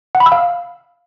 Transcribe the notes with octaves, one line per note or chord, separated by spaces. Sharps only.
F#5
B5
E6
F5